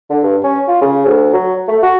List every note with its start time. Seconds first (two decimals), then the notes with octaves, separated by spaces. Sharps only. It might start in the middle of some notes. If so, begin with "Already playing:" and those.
0.10 D3
0.23 G2
0.44 C#4
0.68 F4
0.82 C#3
1.06 D2
1.33 F#3
1.68 A3
1.83 F#4